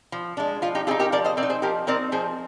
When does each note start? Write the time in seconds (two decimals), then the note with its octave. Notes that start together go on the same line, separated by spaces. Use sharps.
0.12 F3
0.37 G#3 D4
0.62 F3 F4
0.75 D#4 G4
0.87 C4 D#4 F4 G#4
0.99 G4 A#4
1.12 F3 A#4 D5
1.24 C5 D#5
1.37 C4 A#4 D5
1.43 D#4
1.50 G#4 C5
1.62 F3 G4 A#4
1.87 C4 D#4 A#4 D5
2.12 F3 G#4 C5